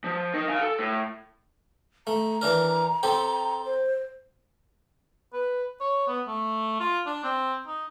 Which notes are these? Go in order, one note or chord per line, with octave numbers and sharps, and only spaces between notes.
F3
D#4 A#4
F5 G#5
A4
A2
A3 A#5
E3 D4 A#4
C4 G4 A4
C5
B4
C#5
B3
A3
F4
D4
C4
D#4